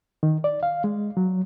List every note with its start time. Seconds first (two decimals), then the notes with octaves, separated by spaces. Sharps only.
0.23 D#3
0.44 D5
0.63 F5
0.84 G#3
1.17 F#3